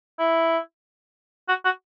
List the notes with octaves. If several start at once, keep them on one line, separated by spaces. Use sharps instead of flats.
E4
F#4
F#4